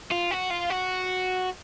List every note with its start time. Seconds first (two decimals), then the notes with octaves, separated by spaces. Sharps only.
0.12 F4
0.31 F#4
0.51 F4
0.70 F#4